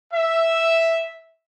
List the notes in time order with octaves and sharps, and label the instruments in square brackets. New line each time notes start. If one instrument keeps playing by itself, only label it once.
[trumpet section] E5